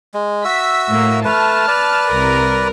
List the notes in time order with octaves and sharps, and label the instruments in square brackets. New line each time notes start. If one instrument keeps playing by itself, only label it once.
[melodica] G#3
[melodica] F#4 E5 E6 [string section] B6
[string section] A2 A#3
[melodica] A3 B4 [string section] A5 F6
[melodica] B4 D5
[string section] C2 A#4